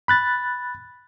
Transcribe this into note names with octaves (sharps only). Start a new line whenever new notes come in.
B5 F#6 A6